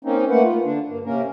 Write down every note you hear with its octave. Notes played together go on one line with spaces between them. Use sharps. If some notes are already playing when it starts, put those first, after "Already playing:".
A#3 C4 C#4 D#4
A3 A#3 B4 F#5
F4
D3 D4
G2 A#3
C3 A#3 C#4 A#4